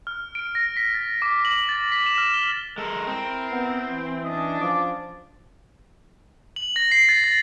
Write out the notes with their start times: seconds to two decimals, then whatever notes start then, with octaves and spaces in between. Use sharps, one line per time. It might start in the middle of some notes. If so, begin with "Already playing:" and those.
0.07 F6
0.35 D7
0.55 A#6
0.77 B6
0.94 A6
1.22 D6
1.45 F#7
1.69 A6
1.92 B6
2.06 E7
2.18 F6
2.34 G7
2.78 G#3 A4 A#4
3.07 C4 E4
3.51 B3
3.90 E3
4.24 C#4 D4 D#5
4.61 F3 D6
6.56 F#7
6.76 A#6
6.92 C7
7.09 A6
7.24 A6